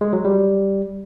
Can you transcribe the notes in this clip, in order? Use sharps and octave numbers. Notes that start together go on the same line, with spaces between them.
G#3
F#3
G3